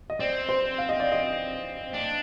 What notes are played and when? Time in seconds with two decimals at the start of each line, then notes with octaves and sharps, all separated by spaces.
0.10 D#5
0.19 C4 D5
0.49 C5
0.78 F5
0.89 D#5
1.00 D5
1.12 D#5
1.94 D4